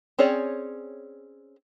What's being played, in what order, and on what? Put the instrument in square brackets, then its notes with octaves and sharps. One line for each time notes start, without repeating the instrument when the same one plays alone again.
[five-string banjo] C4 C#4 G#4 C#5 D5